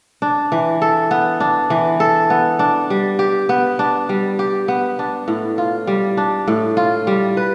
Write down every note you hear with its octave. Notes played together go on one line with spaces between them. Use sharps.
D4
E3
A4
B3
D4
E3
A4
B3
D4
G3
G4
B3
D4
G3
G4
B3
D4
A2
F4
G3
D4
A2
F4
G3
B4